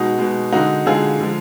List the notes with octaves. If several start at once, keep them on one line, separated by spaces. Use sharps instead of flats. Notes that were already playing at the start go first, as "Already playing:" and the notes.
Already playing: B2 G#3 D#4 F#4
B2 G#3
D3 G#3 D#4 F#4
D3 G#3 F4 G#4
D3 F3 G#3